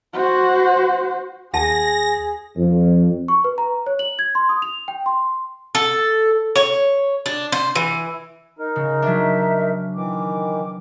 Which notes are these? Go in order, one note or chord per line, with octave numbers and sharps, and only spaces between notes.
F#4 C5
D#2 G#4 F#5 A5 A#6
F2
C#6
B4
A#5
C#5
F#7
G#6
C6
D#6
F7
G5
C6
A4
C#5
D4
C5
E3
D#4 A#4
C#3
F#3 D4 E5
D#3 E3 D6